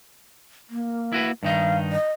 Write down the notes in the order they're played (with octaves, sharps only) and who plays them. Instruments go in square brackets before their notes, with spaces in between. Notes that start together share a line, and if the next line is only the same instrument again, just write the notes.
[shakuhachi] A#3
[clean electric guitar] E4 F#4 B4
[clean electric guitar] G2 D#3 D#4 [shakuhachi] F5
[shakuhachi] D#5